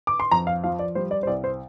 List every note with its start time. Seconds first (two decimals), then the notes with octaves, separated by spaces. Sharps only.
0.07 D6
0.20 C6
0.31 F2 A#5
0.47 F5
0.64 F3 F5
0.79 D5
0.95 G3 C5
1.11 D5
1.23 C5
1.27 C2 D5
1.44 C5